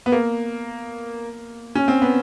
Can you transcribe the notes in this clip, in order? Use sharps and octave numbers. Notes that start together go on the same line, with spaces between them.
B3
A#3
C#4
C4
B3